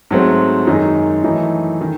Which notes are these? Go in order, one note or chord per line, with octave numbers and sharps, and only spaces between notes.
G#2 F#3 A3 C4
F#2 D#3 G#3 D#4
F#2 E3 A3 D#4
D#3